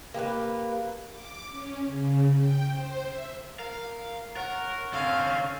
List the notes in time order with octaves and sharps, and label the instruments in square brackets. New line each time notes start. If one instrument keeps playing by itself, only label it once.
[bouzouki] A#3 G4 A#4 B4
[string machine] D6
C#4
C#3
G5
C5
E5
[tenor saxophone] A#4 [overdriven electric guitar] F5
[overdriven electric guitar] A#4 [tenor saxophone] C#5 [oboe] F#5
[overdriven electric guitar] D3 C#4 [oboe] C4 [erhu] F5